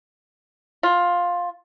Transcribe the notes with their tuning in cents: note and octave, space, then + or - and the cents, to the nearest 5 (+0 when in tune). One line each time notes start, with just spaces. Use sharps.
F4 +10